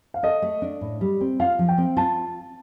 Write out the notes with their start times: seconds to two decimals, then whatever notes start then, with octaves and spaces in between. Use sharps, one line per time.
0.14 F5
0.23 A4 D#5
0.42 A3
0.62 D4
0.81 A2
1.01 G3
1.21 C4
1.40 F4 F5
1.59 F3
1.68 G5
1.78 C4
1.97 F4 A5